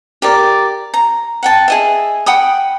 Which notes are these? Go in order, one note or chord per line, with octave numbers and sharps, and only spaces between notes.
G4 A#4 D5
A#5
F#5 G5 A5
G#4 D#5 E5
F#5 G5 B5 D#6